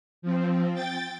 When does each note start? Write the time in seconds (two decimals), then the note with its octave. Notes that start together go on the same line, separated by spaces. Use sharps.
0.22 F3 C4
0.74 G5 A6